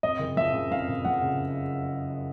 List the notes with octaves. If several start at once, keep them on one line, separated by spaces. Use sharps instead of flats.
F2 D#5
F#1
F3 E5
C#3
F2 F5
F#1
F3 F#5
C#3